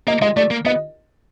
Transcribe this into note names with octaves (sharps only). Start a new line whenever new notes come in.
A#3 D#5
G#3 D#5
A3 D5
A#3
B3 D#5